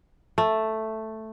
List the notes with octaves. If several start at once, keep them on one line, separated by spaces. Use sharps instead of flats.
A3